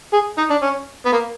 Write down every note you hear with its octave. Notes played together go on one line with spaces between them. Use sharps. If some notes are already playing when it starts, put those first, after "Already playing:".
G#4
D#4
D4
C#4
B3
A#3